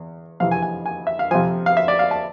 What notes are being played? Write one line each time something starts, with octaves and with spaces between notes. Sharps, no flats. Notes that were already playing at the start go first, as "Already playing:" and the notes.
Already playing: E2
F2 C3 E3 F5
G#5
G#5
G#5
E5
F5
F2 C3 F3 G#5
F5
E5
D5
F5
A5